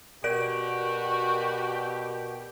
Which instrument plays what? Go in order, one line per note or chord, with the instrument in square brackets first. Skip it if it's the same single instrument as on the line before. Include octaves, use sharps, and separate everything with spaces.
[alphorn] B2 [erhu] F#4 [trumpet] G4 [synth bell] A#4 D5 D7